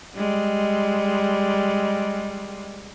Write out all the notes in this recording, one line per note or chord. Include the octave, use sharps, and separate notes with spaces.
G3 G#3